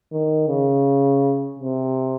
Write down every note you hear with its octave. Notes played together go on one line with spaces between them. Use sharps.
D#3
C#3
C3